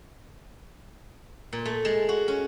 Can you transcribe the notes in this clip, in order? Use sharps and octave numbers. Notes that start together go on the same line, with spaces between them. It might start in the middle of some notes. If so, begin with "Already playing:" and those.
A#2
A3
G#3
F#4
C#4